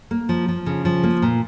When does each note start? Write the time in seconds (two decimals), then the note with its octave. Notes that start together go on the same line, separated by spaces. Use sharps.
0.11 A#3
0.29 F3
0.48 F3
0.66 C#3
0.85 F3
1.03 A#3
1.22 A#2